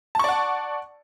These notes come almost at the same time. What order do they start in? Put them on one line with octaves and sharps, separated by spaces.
A5 C#6 D5 F#5